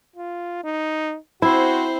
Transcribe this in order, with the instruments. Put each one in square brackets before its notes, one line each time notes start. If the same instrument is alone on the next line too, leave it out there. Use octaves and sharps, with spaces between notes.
[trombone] F4
D#4
[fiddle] C4 C5 [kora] E4 [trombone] F#4